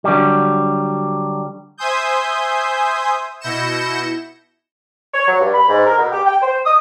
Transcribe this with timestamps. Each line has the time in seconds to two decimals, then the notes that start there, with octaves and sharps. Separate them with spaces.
0.04 D3 F#3 G3
1.78 C5 E5 G#5 C6 D#6 G6
3.40 B2 E4 G6 A#6 C#7 E7
5.14 C#5
5.27 F#3
5.40 G2
5.53 B5
5.69 G#2
5.86 A#4
5.98 B2
6.12 G4
6.26 G5
6.42 C5
6.66 D#6